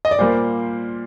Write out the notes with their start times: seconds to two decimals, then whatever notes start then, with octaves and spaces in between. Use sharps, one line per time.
0.05 D#5
0.11 D5
0.19 A#2 G3 A#3 C5